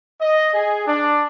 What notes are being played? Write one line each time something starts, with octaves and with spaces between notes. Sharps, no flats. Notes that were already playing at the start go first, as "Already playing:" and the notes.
D#5
G#4
D4